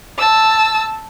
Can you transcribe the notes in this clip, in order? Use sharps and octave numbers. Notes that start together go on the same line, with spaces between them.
A5 E6